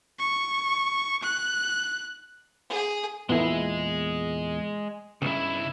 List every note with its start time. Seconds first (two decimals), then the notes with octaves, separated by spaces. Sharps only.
0.19 C#6
1.23 F#6
2.70 G#4
3.29 E2 A#2 G#3 B3 E4 G#4 A4
5.22 B1 G2 C#3 E4